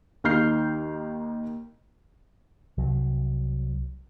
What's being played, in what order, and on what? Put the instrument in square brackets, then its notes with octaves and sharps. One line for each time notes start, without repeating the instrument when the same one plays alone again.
[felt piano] D#2 D#3 D#4 F6 G6 C7
[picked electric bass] C2 F#3